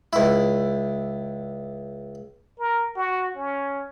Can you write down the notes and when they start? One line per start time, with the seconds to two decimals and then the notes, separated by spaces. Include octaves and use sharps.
0.13 C#2 E4
2.59 A#4
2.96 F#4
3.36 C#4